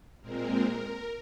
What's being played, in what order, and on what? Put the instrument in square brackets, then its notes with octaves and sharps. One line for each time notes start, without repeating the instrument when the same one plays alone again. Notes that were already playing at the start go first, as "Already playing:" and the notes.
[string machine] A#2 G#3 C4 A#4